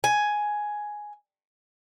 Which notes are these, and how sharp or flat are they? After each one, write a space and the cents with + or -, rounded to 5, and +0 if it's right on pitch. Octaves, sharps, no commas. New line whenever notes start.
G#5 +5